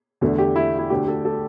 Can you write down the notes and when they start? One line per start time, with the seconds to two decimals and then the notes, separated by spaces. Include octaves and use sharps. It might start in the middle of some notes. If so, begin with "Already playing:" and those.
0.21 E2 D3 A3
0.38 G4
0.56 E4
0.78 E4
0.90 D2 D3 A3 G4
1.08 A4
1.25 A4